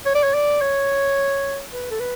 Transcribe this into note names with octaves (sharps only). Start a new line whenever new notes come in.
C#5
D5
C#5
D5
C#5
B4
A4
B4